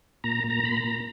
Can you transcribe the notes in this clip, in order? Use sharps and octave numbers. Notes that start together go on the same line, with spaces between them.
A#2 A#5
A#2
A#5
A#2 B5
A#5
A#2